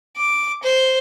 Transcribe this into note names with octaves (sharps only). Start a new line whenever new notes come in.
D6
C5